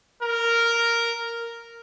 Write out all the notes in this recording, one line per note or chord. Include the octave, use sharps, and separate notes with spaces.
A#4